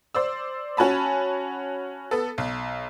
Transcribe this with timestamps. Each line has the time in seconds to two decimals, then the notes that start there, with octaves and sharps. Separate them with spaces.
0.15 C5 D5 E6
0.77 C#4 F#4 G#5 A5 B5
2.11 B3 A4
2.38 B1